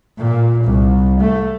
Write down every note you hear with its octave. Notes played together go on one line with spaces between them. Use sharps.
A#2
C2
A3